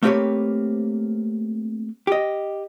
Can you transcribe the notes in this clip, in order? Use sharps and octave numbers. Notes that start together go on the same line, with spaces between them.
A3 A#3 C4 G4 B4 C#5
G4 D#5